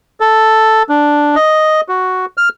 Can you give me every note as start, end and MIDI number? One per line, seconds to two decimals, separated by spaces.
0.20 0.83 69
0.89 1.35 62
1.36 1.81 75
1.89 2.26 66
2.38 2.49 89